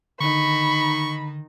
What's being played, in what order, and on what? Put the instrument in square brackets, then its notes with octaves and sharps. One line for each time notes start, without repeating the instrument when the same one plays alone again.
[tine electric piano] D3 [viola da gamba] D#3 D#4 [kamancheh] B5 [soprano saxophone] C#6